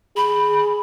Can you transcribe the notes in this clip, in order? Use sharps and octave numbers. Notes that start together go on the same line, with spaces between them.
G#4 B5